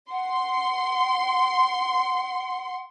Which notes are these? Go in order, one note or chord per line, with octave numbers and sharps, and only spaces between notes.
F#5 C6